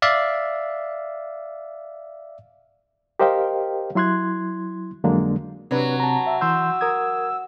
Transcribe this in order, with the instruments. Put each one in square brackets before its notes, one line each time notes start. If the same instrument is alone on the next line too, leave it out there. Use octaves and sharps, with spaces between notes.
[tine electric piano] D5 E5 F5
[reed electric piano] G4 A#4 C5 D#5 F5 G5
F#3 E4 C6 F#6 G#6
F2 D3 F#3 G#3 A#3 D4
[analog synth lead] C3 [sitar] F#3 [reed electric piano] C4 D4 B4
[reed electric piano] A5 A#5
[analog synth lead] E5
[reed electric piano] E3 C6 G6 [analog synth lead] E6
[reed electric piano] A#4 D#6 G#6